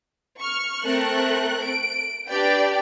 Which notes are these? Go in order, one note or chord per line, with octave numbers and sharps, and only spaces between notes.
C#6 F6
A3 C4 A#4 C#6 F#6
D7
D4 G4 B4 D5 G5